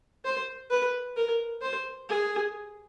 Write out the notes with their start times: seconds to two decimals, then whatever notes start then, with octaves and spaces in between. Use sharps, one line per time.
0.25 C5
0.70 B4
1.16 A#4
1.62 C5
2.09 G#4